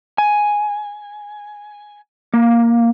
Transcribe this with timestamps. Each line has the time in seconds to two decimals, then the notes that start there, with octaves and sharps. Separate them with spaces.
0.18 G#5
2.34 A#3